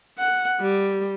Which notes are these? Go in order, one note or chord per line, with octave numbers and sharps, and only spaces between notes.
F#5
G3